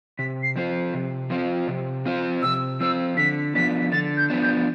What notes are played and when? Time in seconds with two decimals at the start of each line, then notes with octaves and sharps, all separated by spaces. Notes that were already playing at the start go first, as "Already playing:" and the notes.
0.18 C3 B6
0.43 C7
0.56 F3 C4 F4 C5
0.94 C3
1.30 F3 C4 F4 C5
1.68 C3
2.05 F3 C4 F4 C5
2.42 C3 E6
2.80 F3 C4 F4 C5 E6
3.17 D3 B6
3.55 F3 B3 D4 B6
3.92 D3 A6
4.17 G6
4.30 F3 B3 D4
4.42 G6